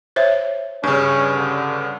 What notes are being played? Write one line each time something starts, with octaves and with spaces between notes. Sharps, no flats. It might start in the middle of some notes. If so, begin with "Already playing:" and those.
C5 C#5 E5
G2 C#3 C#4
D3